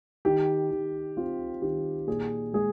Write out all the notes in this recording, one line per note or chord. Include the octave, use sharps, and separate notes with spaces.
D#3 G4
D#3
C4 F4
D#3 G4
A#2 G#4
G#3 G#4